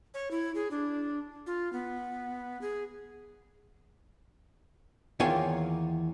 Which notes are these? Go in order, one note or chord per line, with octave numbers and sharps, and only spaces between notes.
C#5
E4
G#4
D4
F4
B3
G#4
E2 D#3 A#3 F4 C#5 G#5